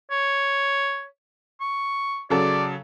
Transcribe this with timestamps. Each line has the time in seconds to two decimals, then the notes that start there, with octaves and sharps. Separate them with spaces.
0.11 C#5
1.60 C#6
2.30 C#3 F#3 A4 D5